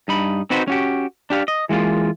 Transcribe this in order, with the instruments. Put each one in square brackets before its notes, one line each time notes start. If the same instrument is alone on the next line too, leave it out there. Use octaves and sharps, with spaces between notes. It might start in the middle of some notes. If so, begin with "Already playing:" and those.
[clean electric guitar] G2 D#4 B5
C4 D#4 F#4 B4 C5
C#4 F#4 G4
D4 G4 F5
D#5
E3 G#3 A#3 F4